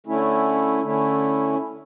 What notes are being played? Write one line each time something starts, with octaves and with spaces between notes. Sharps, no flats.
D3 A3 C#4 E4
D3 A3 C#4 E4